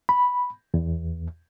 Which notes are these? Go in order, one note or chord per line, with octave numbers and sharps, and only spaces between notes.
B5
E2